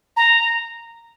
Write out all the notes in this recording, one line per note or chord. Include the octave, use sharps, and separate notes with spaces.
A#5